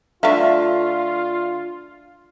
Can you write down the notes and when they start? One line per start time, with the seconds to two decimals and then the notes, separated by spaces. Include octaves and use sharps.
0.23 D3 A3 F4 E5 F5